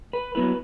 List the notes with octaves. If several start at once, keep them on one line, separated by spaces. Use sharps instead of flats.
B4
F#3 B3 E4 B4